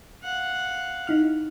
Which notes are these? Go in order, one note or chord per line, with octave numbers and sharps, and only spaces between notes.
F5 F#5
D#4 E4 F6